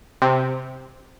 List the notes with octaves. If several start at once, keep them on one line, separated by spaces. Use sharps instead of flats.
C3